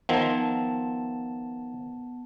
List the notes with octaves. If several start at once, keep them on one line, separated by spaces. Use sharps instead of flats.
D#3 F3 B3 A5